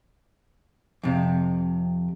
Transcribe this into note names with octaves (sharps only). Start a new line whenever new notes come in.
F2 C3